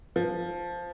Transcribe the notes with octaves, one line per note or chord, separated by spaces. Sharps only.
F3